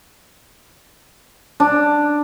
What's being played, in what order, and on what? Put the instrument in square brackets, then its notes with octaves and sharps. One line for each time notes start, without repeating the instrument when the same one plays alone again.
[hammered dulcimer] D4